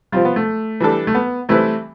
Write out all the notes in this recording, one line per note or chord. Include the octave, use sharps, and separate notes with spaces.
F3 G3 C4 F4
B3
A3
E3 G3 D4 A4
A3
B3
E3 G3 A3 C4 E4 B4